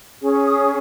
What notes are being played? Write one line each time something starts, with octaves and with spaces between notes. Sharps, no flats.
C#4 G#4 C#5
D#6